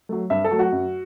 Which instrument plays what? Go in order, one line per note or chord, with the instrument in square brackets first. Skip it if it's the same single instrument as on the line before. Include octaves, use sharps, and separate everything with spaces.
[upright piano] F#3 A3
G2 E5
A4
F#3 A3
F#4
F#2